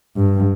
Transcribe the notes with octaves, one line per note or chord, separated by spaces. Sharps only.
G2